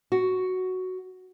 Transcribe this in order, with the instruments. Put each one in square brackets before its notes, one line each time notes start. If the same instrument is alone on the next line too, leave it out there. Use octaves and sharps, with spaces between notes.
[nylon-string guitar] F#4